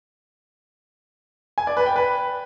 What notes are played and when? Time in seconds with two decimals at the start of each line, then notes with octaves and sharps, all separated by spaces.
1.58 G#5
1.67 D5
1.77 B4
1.86 G5
1.96 B4